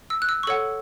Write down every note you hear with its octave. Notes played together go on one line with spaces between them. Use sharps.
E6
F#6
E6
C#6
A4 C#5 F#5 E6